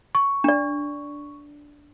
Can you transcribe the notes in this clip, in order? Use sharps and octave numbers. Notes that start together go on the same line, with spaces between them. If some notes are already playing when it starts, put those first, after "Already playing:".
C#6
D4 D5